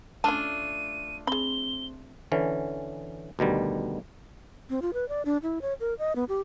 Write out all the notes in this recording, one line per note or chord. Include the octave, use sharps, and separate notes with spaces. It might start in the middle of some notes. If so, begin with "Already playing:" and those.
A3 C#4 D4 F4 A5 D#7
C4 G#4 B5 G7
D3 E3 C#4
D2 B2 D#3 G3
C4
F4
B4
D5
D4
E4
C#5
A#4
D#5
B3
G4